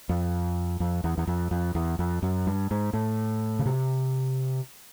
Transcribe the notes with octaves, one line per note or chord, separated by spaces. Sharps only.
F2
F2
E2
E2
F2
F2
E2
F2
F#2
G2
G#2
A2
C#3
C3